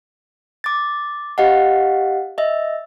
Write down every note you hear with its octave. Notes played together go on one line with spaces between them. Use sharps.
D6 A6
G4 D#5 F5 F#5
D#5 E5